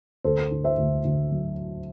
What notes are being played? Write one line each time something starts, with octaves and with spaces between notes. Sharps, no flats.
D2 A4 C5
D3
C5 E5
D2
D2
F#3